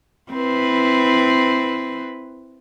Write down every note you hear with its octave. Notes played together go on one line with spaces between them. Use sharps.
C4 E4 B4